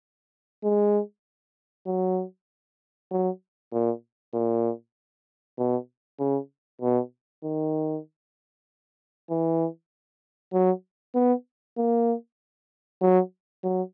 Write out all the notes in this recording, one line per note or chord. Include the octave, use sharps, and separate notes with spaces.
G#3
F#3
F#3
A#2
A#2
B2
C#3
B2
D#3
E3
F#3
B3
A#3
F#3
F#3